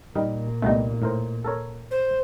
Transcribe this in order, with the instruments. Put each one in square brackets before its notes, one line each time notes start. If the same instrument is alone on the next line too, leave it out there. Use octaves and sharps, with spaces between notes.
[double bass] A#2 [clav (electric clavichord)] G3 D#4 A#4
[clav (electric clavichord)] C2 G3 [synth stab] A3 B3 D#4
[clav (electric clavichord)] A2 A#4 C5
A4 A#4 C#5
[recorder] C5